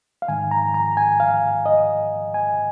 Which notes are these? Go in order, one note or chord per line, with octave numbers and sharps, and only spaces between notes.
F5
G#2 D#3 G#3 G#5
A#5
A#5
G#5
F5
D#5
G#5